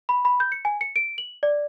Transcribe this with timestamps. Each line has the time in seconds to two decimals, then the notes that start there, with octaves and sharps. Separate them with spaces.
0.09 B5
0.25 B5
0.40 G6
0.52 C#7
0.65 G#5
0.81 C#7
0.96 D7
1.18 F#7
1.43 D5